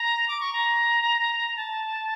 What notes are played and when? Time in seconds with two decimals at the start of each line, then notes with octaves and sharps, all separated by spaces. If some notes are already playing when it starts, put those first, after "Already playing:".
Already playing: A#5
0.28 D6
0.40 C#6
0.53 A#5
1.57 A5